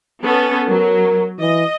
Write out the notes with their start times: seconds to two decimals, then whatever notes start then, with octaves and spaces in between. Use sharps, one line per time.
0.22 B3 C#4 A4
0.68 F#3 A#4
1.40 E3 D#5